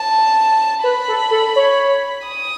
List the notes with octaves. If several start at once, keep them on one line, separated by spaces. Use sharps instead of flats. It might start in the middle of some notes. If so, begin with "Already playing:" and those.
Already playing: A5
B4 B5
A4
A4
C#5
D#6